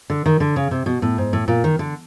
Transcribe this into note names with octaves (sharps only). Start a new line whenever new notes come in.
D3
D#3
D3
C#3
C3
B2
A2
G#2
A2
A#2
D#3
D3